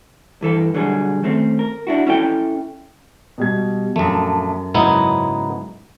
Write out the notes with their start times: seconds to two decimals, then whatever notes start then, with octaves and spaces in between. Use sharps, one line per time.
0.41 G2 E3 A4 B4
0.74 B1 D3 F#3 G3 G#4
1.23 D#3 A3 C4 C#4
1.59 A#4
1.87 D4 E4 F#4
2.07 C#4 E4 A4 G5
3.38 B2 G3 G#6
3.96 A#1 F#2 A3
4.74 G#2 C#3 F#3 B3 D#4 E4